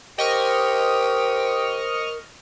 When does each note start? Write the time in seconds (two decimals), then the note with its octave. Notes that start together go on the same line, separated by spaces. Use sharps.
0.18 G4 A#4 C5 D#5 C#6 F6